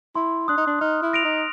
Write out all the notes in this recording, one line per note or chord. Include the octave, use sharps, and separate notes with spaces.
E4 C6
D4 D#6 F#6
D#4
D4
D#4 F6
E4
A#6 D7 F7
D#4